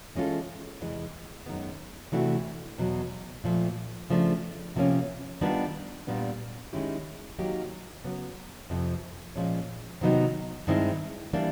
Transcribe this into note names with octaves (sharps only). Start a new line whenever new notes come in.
E3 G#3 C#4 F4 A4
E2 C3 E3 G#3
F#2 D#3 G#3 B3
C3 E3 A3 D4 F#4
E2 B2 F#3
A#2 F3 A3
C#3 F3 A3 D4
C3 F3 A#3 C#4
D#3 G3 B3 D4 F4
A#2 G3 B3 D4
D#3 G#3 C#4 E4 G4
D#3 F#3 A#3 D#4 G4
C#3 F#3 B3
F2 C3 F3
A#2 F3 G#3 C#4
C3 D#3 F#3 B3 D#4
G2 D#3 G#3 C4 E4
E3 G3 A#3 D4